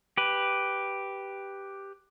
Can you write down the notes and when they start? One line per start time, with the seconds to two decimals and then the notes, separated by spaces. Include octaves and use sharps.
0.17 G4 B4